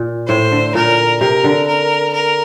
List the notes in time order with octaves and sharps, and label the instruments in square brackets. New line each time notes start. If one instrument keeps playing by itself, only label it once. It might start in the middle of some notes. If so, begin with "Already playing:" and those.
Already playing: [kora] A#2
[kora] A2 [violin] C5
[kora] D3
[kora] A#2 [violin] A#4
[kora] C3 [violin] A#4
[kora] D3
[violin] A#4
A#4